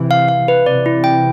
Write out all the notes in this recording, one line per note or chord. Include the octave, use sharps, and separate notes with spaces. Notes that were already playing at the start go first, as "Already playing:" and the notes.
Already playing: C3 E3
F5
F5
B4
C3 E3 D5
E4
G5